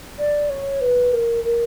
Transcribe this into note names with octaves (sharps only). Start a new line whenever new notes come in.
D5
C#5
B4
A#4
A#4